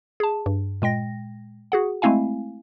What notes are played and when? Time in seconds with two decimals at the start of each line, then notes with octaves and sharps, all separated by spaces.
0.20 G#4 A5
0.46 G2
0.82 A#2 G#3 G5 A#6
1.72 F#4 G#4 F#5
2.02 G#3 A3 C4 E4 F5 G#5